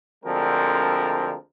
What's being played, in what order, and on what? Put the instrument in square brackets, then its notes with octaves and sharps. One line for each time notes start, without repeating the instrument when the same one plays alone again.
[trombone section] D2 D3 F3 G#3 C4 A#4